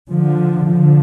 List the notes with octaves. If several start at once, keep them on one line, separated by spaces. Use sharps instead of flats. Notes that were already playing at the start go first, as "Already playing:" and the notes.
D3 F3
D3 F3